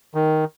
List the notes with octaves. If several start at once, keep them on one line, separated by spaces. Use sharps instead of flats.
D#3